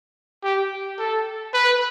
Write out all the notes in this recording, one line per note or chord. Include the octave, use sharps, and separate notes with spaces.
G4
A4
B4